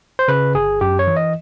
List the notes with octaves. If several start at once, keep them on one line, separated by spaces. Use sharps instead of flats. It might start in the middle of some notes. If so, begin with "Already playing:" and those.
C5
C#3 B4
G1 G#4
F#2 G4
C#5
E3
D#5